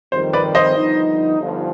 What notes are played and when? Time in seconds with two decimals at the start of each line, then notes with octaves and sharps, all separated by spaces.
0.12 F2 D#3 G3 C4 C5
0.33 B4 D5
0.55 C5 D#5
0.76 G2 D3 F3 B3 D#4
1.39 G1 G2 F3